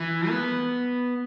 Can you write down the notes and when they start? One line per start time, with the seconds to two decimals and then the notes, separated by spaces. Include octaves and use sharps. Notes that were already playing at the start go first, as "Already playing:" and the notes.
Already playing: E3
0.30 B3